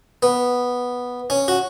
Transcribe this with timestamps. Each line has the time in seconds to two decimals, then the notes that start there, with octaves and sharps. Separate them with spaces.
0.23 B3
1.30 C#4
1.48 F#4